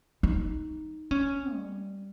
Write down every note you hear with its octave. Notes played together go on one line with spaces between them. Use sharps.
D#4
C#4
G3